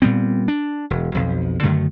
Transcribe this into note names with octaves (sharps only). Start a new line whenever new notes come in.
A#2 G3 B3 C4
D4
E1
B1 F2
F#2 D3 D#3 A3